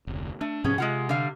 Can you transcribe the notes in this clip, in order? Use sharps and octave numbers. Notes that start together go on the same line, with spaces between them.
F1 D2
A3 D4
G#2 C3 F3 B3 C#4 G#4
C3 G#3 F4 F#5
D3 G3 F5